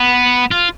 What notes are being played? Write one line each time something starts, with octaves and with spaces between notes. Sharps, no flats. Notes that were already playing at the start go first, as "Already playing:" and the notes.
Already playing: B3
F4